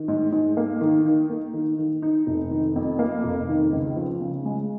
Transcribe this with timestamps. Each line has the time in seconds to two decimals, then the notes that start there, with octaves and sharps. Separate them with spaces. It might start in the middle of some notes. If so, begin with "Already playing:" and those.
Already playing: D#3
0.08 G#2
0.32 G#2
0.57 A#3
0.81 D#3
1.06 D#4
1.30 A#3
1.54 D#3
1.79 D#3
2.02 D#4
2.27 F1
2.51 D#3
2.76 F2
2.99 A#3
3.24 F1
3.49 D#3
3.72 C#2
3.96 F3
4.21 C#3
4.45 G#3